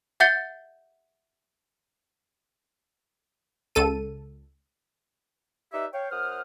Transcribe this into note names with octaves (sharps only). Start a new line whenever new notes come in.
E5 F#5 G6 A6 C#7 G7
C#2 A4 D#7
D#4 G4 B4 D5 E5
C#5 F5 G5
F#2 C5 F#5 D#6 F6